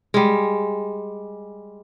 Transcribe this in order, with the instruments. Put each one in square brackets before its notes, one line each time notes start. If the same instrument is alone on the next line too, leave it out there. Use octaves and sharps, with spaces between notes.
[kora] G3 G#3